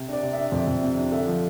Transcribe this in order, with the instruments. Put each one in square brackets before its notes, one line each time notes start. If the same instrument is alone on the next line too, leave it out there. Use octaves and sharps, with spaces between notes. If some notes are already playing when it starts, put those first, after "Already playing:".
Already playing: [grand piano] C3
D4 D5
C3
E5
D4
F2 D5
F2
C3
D4
D3 E5
F3